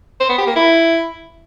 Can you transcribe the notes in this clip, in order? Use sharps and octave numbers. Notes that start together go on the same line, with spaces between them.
C5
B3
G4
A#3
E4